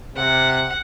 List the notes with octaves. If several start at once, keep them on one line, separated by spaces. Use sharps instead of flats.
C3 F#5